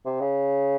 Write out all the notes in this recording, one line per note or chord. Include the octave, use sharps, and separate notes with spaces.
C3
C#3